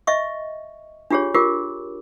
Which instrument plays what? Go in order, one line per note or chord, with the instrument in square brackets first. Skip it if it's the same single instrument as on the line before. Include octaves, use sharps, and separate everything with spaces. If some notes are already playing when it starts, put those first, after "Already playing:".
[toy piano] D#5 E5 C#6
D4 F4 G4 G#4 C#5
F4 G4 A#4 D6